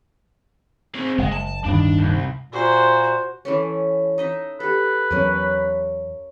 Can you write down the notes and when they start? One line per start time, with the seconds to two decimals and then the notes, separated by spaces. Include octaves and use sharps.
0.94 C4 G#4
1.19 F#1 G#3
1.32 A5
1.64 D1 G2 D#3 D4
1.99 C2
2.53 A#2 F#4 C5
3.45 E3 A3 C#4
4.18 D#4 D#5 E5
4.60 G4 A4 B4
5.11 E2 F#3 C#4 A#4